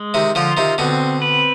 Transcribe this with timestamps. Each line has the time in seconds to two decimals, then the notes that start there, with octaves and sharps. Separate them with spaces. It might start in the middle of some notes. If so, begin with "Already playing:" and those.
Already playing: G#3
0.14 C3 D#3
0.35 D3 F3 F4
0.57 C3 D#3
0.78 B2 D3 C4
1.22 B4